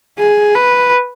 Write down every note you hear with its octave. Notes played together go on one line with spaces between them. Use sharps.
G#4
B4